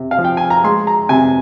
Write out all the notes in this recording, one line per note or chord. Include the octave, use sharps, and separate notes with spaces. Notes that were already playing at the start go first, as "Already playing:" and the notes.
Already playing: C3
F5
F3
G5
G#5
A#5
G#3 C6
A#5
C3 G#5